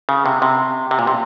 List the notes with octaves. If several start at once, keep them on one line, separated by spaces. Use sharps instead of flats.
C#3
C3
C3
C3
A#2
C3